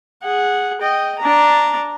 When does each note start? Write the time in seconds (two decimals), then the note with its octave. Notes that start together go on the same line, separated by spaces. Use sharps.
0.23 G#4 F#5
0.81 D#5 G5
1.19 D4 A#5